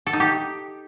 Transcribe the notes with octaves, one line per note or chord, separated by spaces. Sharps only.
A4
D#4
G4